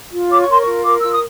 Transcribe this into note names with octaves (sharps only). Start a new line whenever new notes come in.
F4
C#5 D6
C#6
A#4 C6
C#6
F4
A#4 D6
F4 E6
D#6